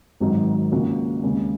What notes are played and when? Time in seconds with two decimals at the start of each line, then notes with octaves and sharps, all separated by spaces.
0.20 G#1 G#2 D#3 F#3 D#4
0.72 C#2 C#3 A#3 F#4
1.24 D#2 C#3 G#3